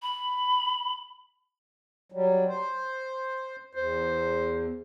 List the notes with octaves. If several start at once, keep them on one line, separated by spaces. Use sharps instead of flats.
B5
F#3 G3
C5
E2 C5